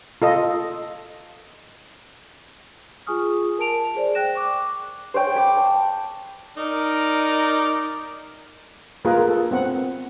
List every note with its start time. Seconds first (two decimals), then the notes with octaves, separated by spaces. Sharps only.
0.22 F4 A4 D#5
3.07 F4 G#4 G#5 C#6 D#6 F6
3.58 A#4 G#5 A5 D7 F7
3.95 G#4 C5 D5
4.15 G5 F#6 A#6 E7
4.35 C#6 D6 F#6
5.14 C5 C#5 G5 G#5
5.35 G5 B5 D6
5.57 A5
6.58 D#4 A#4 D5
9.05 A#3 F4 G#4 A#4 B4
9.29 A4
9.51 B3 C4 F#5